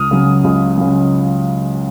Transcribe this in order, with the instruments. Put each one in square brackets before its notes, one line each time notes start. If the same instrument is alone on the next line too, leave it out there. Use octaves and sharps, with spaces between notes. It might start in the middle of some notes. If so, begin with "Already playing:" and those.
Already playing: [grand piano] C#2 D#6 F6
C#3 F#3
C#2
C#3 F#3